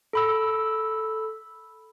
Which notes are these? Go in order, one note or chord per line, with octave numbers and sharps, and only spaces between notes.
A4 B5 E6